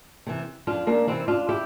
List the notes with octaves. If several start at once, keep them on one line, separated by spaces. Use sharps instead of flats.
C3 E3
F2 D4 F4
A#3 D4
C3 E3 C4 E4
D4 F4
E4 G4